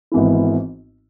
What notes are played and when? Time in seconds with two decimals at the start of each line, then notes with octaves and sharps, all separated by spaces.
0.12 G#1 G#2 E3 B3 E4